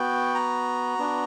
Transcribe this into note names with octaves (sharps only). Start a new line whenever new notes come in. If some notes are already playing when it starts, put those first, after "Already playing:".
Already playing: B3 F#4 G5
A#5
B3 D4 F#4